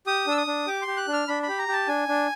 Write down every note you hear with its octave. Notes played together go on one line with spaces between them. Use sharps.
G4 D#6
D4 E6
D#6
D4
G4 D6
C6
G4
F#6
D4
F6
D4 B5
B5
G4
A#5
G4 A5
D4 G#5
D4